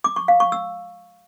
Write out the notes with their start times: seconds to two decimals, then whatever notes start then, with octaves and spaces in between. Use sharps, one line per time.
0.04 D6
0.16 C#6
0.28 F5
0.40 C#6
0.52 E6